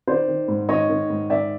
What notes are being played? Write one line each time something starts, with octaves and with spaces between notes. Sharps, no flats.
D#3 C5 D5
D#3
G#2
D#3 C#5 D#5
D#3
G#2
D#3 D5 E5